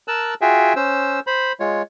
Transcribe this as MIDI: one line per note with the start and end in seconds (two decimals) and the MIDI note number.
0.08 0.34 70
0.08 0.34 81
0.08 0.34 88
0.08 0.34 90
0.41 0.73 65
0.41 0.73 66
0.41 0.73 68
0.41 0.73 76
0.41 0.73 79
0.41 0.73 80
0.76 1.20 61
0.76 1.20 72
0.76 1.20 88
1.27 1.52 72
1.27 1.52 83
1.60 1.82 56
1.60 1.82 65
1.60 1.82 73